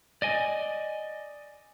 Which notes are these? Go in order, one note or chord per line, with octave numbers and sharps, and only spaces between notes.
D5 D#5 G#5